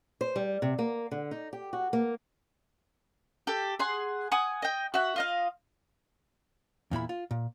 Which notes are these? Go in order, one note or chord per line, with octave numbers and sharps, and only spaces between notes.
C5
G3
C3
A#3
D3
D#4
G4
F#4
A#3
G4 A4
G#4 F#5 C6
F#5 G#5 D#6
D#5 G5
F#4 E5 F#5
F4 D#5 F5
E2 A#2 E4 B5
F4
A#2